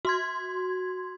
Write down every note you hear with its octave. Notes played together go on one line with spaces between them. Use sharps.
F#4 C6 G#6